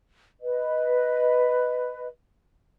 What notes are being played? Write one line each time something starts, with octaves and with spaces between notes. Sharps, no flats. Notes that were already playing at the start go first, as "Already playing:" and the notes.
B4 D#5